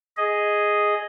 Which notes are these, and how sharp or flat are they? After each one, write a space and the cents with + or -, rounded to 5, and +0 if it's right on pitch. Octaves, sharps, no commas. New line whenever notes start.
G#4 +0 D#5 +0